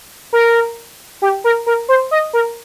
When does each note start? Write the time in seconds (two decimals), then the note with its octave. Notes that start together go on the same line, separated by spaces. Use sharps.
0.33 A#4
1.22 G4
1.44 A#4
1.66 A#4
1.89 C5
2.11 D#5
2.33 A#4